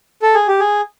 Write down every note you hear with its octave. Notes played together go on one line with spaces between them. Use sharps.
A4
G#4
G4
G#4